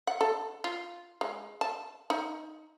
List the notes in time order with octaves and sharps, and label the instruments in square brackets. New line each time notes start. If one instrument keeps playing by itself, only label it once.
[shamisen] F#5
A4
F4
G#3
A5
D#4